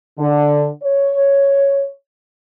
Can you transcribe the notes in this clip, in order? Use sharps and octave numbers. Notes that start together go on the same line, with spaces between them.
D3
C#5